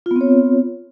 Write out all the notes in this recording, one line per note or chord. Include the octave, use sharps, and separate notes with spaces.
B3 C4 F4 C#5